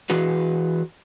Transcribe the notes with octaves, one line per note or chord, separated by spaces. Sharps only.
E3 F#4 G#4 B4